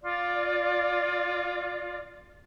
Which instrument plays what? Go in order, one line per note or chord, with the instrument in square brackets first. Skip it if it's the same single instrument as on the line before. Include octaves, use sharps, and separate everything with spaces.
[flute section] F4 D5